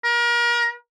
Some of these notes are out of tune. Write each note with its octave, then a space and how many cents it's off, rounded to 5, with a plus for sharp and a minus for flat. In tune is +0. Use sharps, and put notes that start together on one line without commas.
A#4 +35